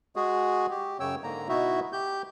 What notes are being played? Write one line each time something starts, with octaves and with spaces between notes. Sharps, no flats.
G#3 F#4 G#4
G4
F#2 C#3 C#5 G5 E6
G#2 D3 A#3 A#5
B2 D#4 E4 F#4 E5
G4 G6